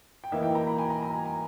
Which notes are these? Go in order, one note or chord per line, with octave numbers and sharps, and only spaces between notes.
G5
E3 A#3 D#4 E5
G5
A#5
B5
G#5
A#5
A#5
G#5
G#5